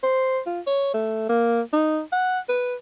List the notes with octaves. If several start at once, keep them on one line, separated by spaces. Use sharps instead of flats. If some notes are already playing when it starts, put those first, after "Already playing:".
C5
F4
C#5
A3
A#3
D#4
F#5
B4